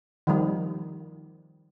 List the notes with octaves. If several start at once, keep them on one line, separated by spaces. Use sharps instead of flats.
D#3 F3 G3